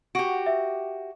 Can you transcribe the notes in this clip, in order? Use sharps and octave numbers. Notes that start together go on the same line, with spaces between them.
F#4 G4 D7
E5